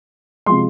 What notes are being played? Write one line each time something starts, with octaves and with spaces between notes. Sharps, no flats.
C3 F3 G#3 C6